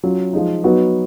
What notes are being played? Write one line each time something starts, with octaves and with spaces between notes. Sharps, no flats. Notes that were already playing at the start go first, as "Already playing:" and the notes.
F#3 C#4 F4
F3 G#3 D#4
F#3 B3 D#4 F#4 B4